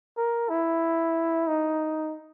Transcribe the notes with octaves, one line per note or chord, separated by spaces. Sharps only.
A#4
E4
D#4